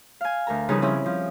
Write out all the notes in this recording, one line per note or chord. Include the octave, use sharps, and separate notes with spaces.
F5 G#5
D2 A#4 A#5
C#3 F3 G3 D#4 G#4 B4
C4 C#4 E4 G#4
F3